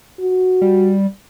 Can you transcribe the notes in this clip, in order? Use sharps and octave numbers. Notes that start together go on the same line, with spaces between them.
F#4
G3